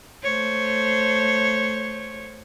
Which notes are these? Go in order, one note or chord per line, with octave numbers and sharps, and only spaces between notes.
A3 C5 C#5